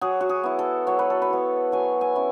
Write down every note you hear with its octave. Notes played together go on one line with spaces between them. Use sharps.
F#3 G#4
F#4
G#4
B3 E4
A4
F#3 C#5
B4
A4
B4
B3 E4
F#3 G#5
G#5
C#4 E4